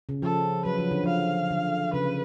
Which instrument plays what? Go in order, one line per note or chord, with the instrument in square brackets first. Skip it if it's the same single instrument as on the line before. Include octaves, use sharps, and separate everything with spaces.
[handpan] C#3
[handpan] F3 [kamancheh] A4
[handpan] F#3 [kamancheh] B4
[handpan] F3
D3
[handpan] F3 [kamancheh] F5
[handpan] D3
[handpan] C#3 [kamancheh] B4